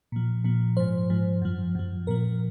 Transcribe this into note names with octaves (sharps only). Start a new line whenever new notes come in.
A#2 F3
A#2 F3
G#2 F3 C5
G#2 F3
F#2 F3
F#2 F3
A#2 F3 A#4